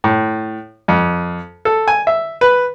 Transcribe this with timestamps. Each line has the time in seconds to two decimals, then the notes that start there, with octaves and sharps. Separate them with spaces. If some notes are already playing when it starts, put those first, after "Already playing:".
0.04 A2
0.88 F2
1.65 A4
1.88 G#5
2.07 E5
2.41 B4